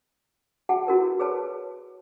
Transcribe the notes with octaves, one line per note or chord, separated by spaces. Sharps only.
F#4 G#4 F#5 A5
E4 F#4 A#4 B4
G#4 B4 C#5 A5